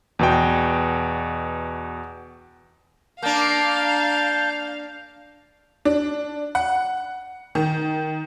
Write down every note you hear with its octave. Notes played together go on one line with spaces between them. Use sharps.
E2 B2 G5
A#3 D4 F5 A5 G6
D4
F#5
D#3